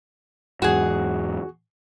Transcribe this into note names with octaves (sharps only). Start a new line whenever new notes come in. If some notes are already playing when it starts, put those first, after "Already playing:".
E2 G#2 F#4 G#4